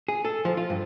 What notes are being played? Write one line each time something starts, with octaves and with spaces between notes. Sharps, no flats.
G#4
A4
F3
F4
G2